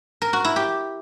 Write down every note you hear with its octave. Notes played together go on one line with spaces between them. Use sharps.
A#4
F#4
E4
G4